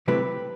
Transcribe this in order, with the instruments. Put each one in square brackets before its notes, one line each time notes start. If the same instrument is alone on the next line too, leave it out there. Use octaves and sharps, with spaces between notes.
[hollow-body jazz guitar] C3 F#3 A3 C4 E4 G4 B4